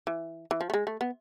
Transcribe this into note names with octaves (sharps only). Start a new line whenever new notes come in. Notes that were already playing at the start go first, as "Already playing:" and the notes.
E3
E3
F3
A3
G#3
A3
B3